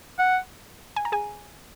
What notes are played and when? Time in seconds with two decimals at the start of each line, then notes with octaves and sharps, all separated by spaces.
0.19 F#5
0.96 G#5
1.05 A#5
1.12 G#4 G#5